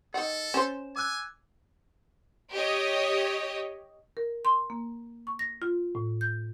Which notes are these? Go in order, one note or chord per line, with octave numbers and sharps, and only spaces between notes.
D#3 A4 F#5
C#4 C5 E7
G#5 D6 E6 F#6
G4 C#5 D#5
A#4
C6
A#3
C#6
A#6
F4
A2
G6